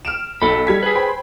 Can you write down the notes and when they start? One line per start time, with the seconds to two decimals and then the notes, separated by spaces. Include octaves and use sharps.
0.05 F6 D7 E7
0.42 B1 A4 B5
0.67 G3 G#6 B6
0.83 G#4 B4
0.95 C5 G5 B5